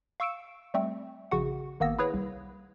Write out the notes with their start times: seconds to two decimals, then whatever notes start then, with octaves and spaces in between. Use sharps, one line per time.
0.20 F5 C#6 E6 C#7 D7 E7
0.74 G3 A3 C4
1.31 A#1 C#3 F#4 F#5
1.80 G#1 D#3 A#3 B3 E6 A#6
1.99 E4 G#4 B4 C#5
2.14 C2